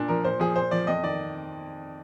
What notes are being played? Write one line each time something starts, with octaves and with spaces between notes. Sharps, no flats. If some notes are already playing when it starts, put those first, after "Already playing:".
Already playing: A#2 D4
F3 A#4
A#2 C5
F3 G#4
A#2 C5
F3 D5
F2 D#5
D#3 D5